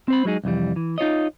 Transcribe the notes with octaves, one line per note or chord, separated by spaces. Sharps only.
C4 C5 B5
F#3 G#3 D#4 G#4
C2 F2 E3 G3
E3
D#4 F4 C#5 D#5